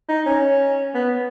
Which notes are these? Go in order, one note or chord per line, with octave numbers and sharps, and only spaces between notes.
D#4
C#4
B3